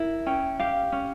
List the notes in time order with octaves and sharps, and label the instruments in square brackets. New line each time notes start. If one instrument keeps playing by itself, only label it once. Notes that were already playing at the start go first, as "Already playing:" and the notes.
Already playing: [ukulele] E4 A#4
C#4 G5
G4 F5
C#4